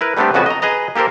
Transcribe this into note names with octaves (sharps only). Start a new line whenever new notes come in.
E4 A#4 B4
G3 A3 B3 C4 D4 G4
F2 C#3 B3 F#4 G#5 A5
D#5 A#5
G#4 B4 D#5 A#5
A#3 G4 A4 A#4 C5